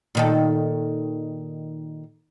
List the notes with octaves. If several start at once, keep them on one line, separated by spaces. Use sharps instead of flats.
A#2 D#3 A4